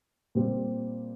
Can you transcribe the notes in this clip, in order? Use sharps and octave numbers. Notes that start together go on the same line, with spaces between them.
A#2 G3 C4